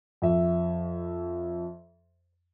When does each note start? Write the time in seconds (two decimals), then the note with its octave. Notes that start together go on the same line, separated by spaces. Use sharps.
0.22 F2 E5